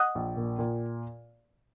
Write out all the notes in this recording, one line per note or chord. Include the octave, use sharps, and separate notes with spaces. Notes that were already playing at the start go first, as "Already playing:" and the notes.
Already playing: D#5 F#5
A#1
A#2
A#2